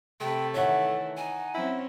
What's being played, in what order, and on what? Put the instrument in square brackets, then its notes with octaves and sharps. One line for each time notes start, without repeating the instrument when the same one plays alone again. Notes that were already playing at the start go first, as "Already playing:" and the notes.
[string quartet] C3 A5 B5 [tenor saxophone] A3 [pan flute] G5
[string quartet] D#3 E3 E4 [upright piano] C#5 F#5 [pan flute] E5
[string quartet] D#4 [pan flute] G#5
[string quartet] F#3 C4 C#4 [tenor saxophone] E4